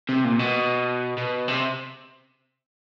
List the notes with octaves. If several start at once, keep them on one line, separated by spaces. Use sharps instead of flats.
C3
A#2
B2
B2
C3